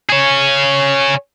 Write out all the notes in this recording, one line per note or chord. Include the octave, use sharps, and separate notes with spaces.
G#4 C#5